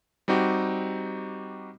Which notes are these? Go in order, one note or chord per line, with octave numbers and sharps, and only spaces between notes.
G3 C4 D#4 F#4 G4